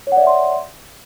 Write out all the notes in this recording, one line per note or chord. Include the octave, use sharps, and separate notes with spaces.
C#5 D5 E5 F#5 C6